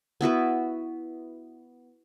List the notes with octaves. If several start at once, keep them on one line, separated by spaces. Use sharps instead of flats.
B3 E4 F#4 B4